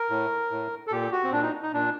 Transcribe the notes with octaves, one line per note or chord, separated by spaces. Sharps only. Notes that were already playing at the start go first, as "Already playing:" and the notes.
Already playing: A#4
A2
A2
A4
A#2 G4
F#4
C4
A#2 D4
D#4
D#4
A#2 D4